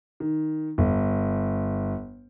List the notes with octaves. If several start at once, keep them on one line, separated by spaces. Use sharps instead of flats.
D#3
G1